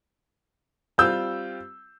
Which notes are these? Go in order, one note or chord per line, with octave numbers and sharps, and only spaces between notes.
G3 C4 F4 E6 G6